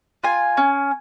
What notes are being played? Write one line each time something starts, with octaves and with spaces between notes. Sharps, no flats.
F4 G#5
C#4